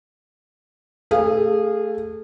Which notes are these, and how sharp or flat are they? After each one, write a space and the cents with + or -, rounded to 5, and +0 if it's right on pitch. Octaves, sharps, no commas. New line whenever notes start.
A3 +0 G#4 -25 F5 +0